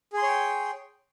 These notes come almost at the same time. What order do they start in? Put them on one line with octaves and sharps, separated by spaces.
G#4 C6 C#5 G5